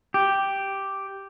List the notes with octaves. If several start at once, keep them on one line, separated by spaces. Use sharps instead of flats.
G4